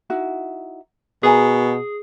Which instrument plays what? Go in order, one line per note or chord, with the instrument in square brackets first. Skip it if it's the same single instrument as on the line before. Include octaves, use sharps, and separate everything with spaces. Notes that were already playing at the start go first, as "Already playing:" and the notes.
[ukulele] D#4 E4 F#4
[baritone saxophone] B2 [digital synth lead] G#4 [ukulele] A#4 G#5 A#5